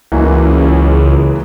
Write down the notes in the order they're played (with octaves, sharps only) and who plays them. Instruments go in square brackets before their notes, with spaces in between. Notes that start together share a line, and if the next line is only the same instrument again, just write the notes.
[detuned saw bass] C#2 [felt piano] E3 A#3 F#4